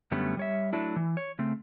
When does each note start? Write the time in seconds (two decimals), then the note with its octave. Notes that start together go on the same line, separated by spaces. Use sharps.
0.11 F#2 D3 G3 A3 B3 C#4
0.37 G3 C#5 E5
0.73 F#3 A3 D4 E4
0.96 E3
1.17 C#5
1.39 C#3 A3 C4